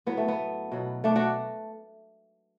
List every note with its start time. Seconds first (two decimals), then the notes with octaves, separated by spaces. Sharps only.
0.06 A2 F#3 B3
0.17 A3
0.28 B3
0.72 B2 F#3
1.04 A3 D4
1.15 D4 F#4